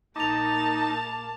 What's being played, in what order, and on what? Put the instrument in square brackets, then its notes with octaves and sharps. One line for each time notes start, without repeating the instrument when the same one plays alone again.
[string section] A#1 A#3 [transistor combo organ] D#4 [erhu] A5 [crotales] D6 F7